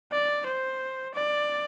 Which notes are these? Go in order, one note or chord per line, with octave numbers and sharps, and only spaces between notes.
D5
C5
D5